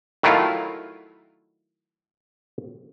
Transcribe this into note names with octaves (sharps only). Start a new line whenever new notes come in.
D#3 F#3 A3 E4 F4